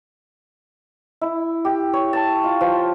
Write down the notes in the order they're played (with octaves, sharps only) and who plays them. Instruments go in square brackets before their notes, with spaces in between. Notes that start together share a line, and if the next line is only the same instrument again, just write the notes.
[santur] E4
G4
C#5
A5
F4
F3